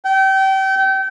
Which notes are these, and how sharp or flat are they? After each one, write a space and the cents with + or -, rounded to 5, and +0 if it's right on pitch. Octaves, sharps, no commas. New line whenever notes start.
G5 -30